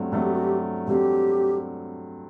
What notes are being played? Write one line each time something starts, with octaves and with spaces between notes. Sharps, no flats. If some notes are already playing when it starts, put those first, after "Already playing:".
Already playing: G2 F#3 A3 C4
G2 F#3 A3 C4 A4
G4
F#4
G4
G2 F#3 A3 C4 G4